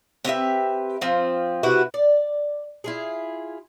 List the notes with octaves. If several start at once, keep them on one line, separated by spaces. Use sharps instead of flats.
C4 G4 B4 E5
F3 C4 F4
C3 E4 F#4 B4
D5
E4 F4 G#4